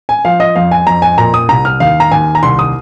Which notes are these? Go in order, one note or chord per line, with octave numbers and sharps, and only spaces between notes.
G#5
F3 F5
D#5
F2 F5
G#5
F2 A#5
G#5
A#2 A#5
D#6
C2 A#5
F6
D#2 F5
A#5
D#2 G#5
A#5
C2 C6
D#6